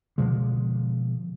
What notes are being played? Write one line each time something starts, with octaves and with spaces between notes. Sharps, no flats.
B2 D3 F3 G#3